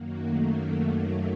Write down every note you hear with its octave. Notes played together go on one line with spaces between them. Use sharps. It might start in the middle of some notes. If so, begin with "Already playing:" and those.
Already playing: F#2 D#3 F#3 A#3
A3
A3